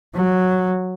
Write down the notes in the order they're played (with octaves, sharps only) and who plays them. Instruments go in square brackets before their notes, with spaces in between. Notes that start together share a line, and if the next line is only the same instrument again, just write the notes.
[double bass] F#3